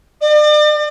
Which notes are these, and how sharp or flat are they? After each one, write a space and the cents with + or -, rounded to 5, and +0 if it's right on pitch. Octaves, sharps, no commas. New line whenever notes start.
D5 +40